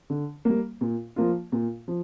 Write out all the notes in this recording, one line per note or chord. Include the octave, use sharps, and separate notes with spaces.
D3
G3 A#3
A#2
F3 A#3 F4
A#2
F3